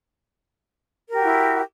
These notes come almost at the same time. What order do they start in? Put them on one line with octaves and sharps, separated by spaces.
A#4 G4 F#4 E4